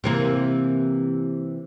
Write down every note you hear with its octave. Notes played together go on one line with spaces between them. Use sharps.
C3 E3 A#3